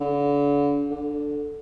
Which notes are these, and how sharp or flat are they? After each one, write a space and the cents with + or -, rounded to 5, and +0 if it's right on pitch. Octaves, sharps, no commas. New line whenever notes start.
D3 -35
D3 +0